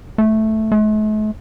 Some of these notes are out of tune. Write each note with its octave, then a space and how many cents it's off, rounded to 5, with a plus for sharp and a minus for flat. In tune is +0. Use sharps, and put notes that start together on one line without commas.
A3 -5
A3 -45